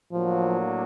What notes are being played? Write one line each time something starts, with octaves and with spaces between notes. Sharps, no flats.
A2 F3 F#3 A#3 D4